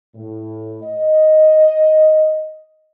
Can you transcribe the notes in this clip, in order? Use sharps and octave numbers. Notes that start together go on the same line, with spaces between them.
A2
D#5